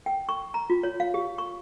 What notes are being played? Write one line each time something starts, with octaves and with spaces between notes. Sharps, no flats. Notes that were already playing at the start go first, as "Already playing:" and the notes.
G5
C#6
A#5
F4
C#5
F5
G4
C#6